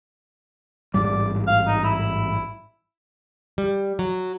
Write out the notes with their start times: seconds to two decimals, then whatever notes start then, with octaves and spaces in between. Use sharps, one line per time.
0.94 A1 G#2 G3 D5
1.47 F5
1.67 D#4
1.84 E4
3.58 G3
3.99 F#3